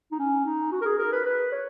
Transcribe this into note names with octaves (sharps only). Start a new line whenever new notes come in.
D#4
C#4
D#4
F#4
A#4
G#4
A#4
B4
B4
C#5